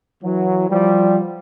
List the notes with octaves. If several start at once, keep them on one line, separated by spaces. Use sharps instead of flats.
E3 F#3
F3 G3